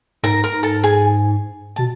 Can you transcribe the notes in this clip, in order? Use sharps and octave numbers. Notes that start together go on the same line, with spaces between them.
G#2 A#4 A#5
A#4 A#5
A4 A5
G#4 G#5
B2 A5